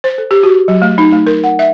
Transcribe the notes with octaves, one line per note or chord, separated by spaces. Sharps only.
C5
A4
G4
F#4
F#3
A3
D#4
A3
A#4
F#5
E5